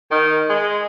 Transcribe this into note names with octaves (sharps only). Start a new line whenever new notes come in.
D#3
G#3